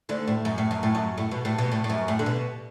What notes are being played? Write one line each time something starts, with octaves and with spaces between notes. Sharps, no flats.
D2 D3
A2
F#2
A2
F#2
A2
F#2
A2
B2
A2
B2
A2
A2
F#2
A2
D3
B2